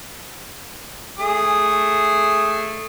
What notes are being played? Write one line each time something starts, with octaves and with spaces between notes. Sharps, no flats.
A3 G#4 D#6